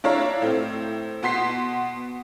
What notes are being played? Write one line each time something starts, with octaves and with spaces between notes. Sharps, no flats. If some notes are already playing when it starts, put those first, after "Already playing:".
D4 E4 C#5 F5 A#5
A2 C4
B2 B3 C6 B6 C7